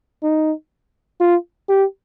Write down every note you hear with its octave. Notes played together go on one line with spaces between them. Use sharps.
D#4
F4
G4